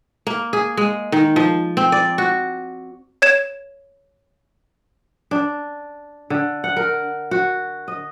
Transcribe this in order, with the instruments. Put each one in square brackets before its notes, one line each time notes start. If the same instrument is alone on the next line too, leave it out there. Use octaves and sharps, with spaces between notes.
[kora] A#3
G#4
G#3
D#3
F3
C4
D5
F#4
[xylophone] C#5 G#6 E7
[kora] D4
D3
F#5
A#4
F#4
D#5